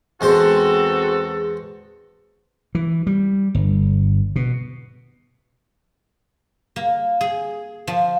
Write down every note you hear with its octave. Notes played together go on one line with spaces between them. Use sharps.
E2 G#3 C4 F#4 A4 C5
E3
G3
G1
B2
A#3
G#4
F3